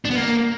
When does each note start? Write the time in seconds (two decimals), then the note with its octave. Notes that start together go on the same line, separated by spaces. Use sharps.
0.05 D4
0.10 B3
0.16 A#3